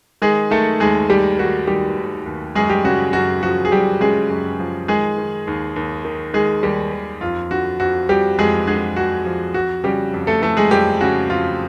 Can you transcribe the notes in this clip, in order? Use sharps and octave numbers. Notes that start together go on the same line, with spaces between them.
D#3 G#3 G#4
D#3 A3 A4
D#2 G#3 G#4
D#2 G3 G4
D#3 F#4
D#3 G3 G4
D#2
D#2
F#2 G#3 G#4
G3 G4
C#3 F#4
F#2 F#4
F3 F#4
G#4
F#2 G3 G4
C#3 G#3 G#4
F#2
F3
D#3 G#3 G#4
D#3
D#2
D#2
D#3
D#3 G#3 G#4
D#2 G3 G4
D#2
F2 F4
D3 F#4
F2 F#4
F3 G3 G4
F2 G#3 G#4
D3 G#3 G#4
F2 F#4
F3
F2 F#4
C#3 G3 G4
F2
A3 A4
E3 A3 A4
G#3 G#4
F2 G3 G4
C#3 F#4
F2 F4